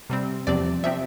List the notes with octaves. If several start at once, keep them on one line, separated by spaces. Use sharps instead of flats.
C3 G3 C4
E2 C3 F3 C4 D5
C3 F3 C4 E5